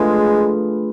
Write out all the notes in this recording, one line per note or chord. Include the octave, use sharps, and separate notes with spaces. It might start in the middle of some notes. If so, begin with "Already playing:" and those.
Already playing: G#3 A3 D4 F4 G#4 B4